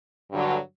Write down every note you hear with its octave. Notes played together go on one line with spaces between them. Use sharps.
G2 D3 F#3